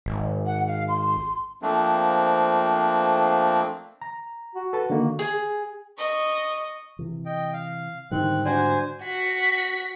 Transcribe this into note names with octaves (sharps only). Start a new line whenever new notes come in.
G#1
F#5
F5
C6
F3 A3 A#3 C4 D4
A#5
F#4
A4 B4 A5
D3 D#3 A#3
G#4
D#5 C#6
C3 E3
D#5 G5
F5
G#2 D3 D#3 G3 C4 F#6
D4 F#4 C5 G#5
F#4 B6